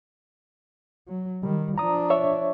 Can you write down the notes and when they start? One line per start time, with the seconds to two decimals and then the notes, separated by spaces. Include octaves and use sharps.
1.08 F#3
1.43 D#3 G3
1.78 F3 D4 A#5 D#6
2.10 C#5 E5 C#6